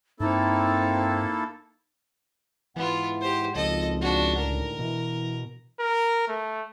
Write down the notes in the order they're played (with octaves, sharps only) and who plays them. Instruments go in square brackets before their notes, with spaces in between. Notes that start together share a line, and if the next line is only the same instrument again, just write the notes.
[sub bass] G2 [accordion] A#3 E4 A4 [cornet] C4 [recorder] D#4
[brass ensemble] G#2 F#5 [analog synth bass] E3 [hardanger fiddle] B3 F4
[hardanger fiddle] G4 C5
[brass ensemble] G#1 F3 [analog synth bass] C#2 [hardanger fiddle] A4 D#5
[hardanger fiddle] D4 F#4
[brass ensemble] A2 D3 D#3 [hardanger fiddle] A#4
[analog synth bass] B2 [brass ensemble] E3
[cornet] A#4
A3